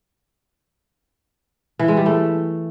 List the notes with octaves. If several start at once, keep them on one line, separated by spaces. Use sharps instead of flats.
E3
G#3
G3
A3